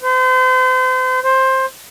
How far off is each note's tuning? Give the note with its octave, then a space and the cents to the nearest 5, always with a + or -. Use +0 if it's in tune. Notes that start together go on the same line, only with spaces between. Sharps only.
C5 -35
C5 +15